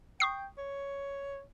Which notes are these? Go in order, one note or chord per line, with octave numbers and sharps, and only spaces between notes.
G5 C#6 D#6 C7
C#5